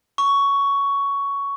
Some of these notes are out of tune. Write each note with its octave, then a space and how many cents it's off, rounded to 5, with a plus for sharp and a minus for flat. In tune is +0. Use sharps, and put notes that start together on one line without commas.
C#6 +10